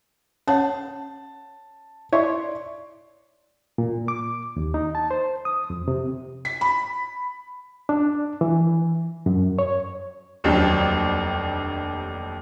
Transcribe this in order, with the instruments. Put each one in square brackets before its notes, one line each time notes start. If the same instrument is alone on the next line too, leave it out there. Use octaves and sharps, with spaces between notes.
[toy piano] C#4 C#5 F#5 [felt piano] A5
[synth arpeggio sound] E4 C#5 E5 [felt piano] D5 C6 C#6
[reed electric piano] A#2
D6
D#2
D#4
A5
C5
D#6
F2
C3
[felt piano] B6
B5
[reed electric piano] D4
E3
F#2
C#5
[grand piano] F1 D#2 F#3 C4 D4 G4